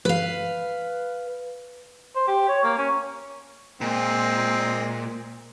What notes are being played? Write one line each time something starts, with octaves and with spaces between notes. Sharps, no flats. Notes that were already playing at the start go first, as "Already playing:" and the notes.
B4 F5
C5
G4
C#5
A#3
C#4
A#2 G#3 C4